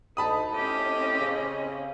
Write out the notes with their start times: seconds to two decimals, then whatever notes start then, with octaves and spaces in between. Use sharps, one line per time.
0.17 D2 D#4 A5 B5 D#6
0.53 A2 C4 C#4 G4 D#5
1.20 C#3